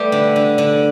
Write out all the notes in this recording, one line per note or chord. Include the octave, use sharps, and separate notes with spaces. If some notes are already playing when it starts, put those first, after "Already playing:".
Already playing: G3 A3 B3 G4
D3
D3
D3